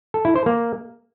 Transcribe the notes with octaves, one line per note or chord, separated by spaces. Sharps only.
A4
E4
C5
A#3